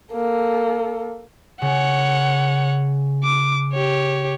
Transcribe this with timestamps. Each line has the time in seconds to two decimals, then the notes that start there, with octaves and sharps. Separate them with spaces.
0.13 A#3 A4
1.62 C#3 C#5 F#5
3.24 D6
3.73 G4 C#5